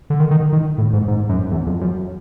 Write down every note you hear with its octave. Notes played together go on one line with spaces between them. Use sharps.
D3
D#3
D#3
D#3
A2
G#2
G#2
F#2
E2
F2
F#2